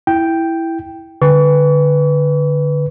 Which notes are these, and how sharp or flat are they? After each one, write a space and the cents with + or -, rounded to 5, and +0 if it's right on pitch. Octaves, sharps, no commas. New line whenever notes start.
E4 +0 G5 +0
D3 +0 B4 +0 C#6 +45